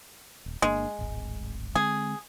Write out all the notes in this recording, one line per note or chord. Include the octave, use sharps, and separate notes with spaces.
D#1
G1 G#3 A#3 D4
D1 G#1
D3 G#3 C4 G#4